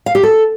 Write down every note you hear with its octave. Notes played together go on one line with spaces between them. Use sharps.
F5
G4
A4